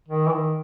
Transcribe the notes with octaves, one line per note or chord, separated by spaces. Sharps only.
D#3
E3
D#3